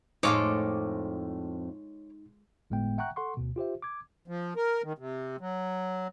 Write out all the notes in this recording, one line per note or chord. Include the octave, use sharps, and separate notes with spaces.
F2 A2 G#3 D#4 F4 A4 C#5 D6
G1 A2 G#3 B3 G5
E5 F#5 G5 A#5 C#6 F#6
A4 F#5 C6 C#6
D2 B2
F4 G4 C5 E5
D6 G#6
F3
A#4
D#3
C3
F#3